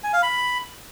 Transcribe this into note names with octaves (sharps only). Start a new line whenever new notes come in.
G#5
F5
B5